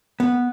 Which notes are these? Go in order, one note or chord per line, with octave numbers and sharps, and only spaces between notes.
B3